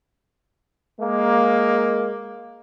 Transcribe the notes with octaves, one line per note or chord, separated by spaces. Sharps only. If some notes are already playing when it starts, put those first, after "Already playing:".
G#3 A#3